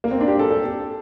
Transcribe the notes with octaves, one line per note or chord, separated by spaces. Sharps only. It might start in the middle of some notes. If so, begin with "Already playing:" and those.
A#3
C4
D4
G4
A4
A4